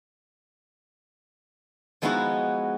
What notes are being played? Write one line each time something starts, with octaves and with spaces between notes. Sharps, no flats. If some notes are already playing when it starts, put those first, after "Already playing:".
F3 G#3 B3 D#4 E4 F#4